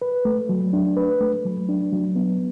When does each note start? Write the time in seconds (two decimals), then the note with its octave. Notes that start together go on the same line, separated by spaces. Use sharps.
0.02 B4
0.25 A3
0.49 F#3
0.73 D4
0.97 B4
1.21 A3
1.45 F#3
1.69 D4
1.92 F#3
2.15 B3